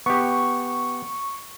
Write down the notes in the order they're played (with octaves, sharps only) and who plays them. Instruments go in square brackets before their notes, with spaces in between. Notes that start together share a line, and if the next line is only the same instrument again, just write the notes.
[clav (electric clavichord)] B3 G4 [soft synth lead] C#6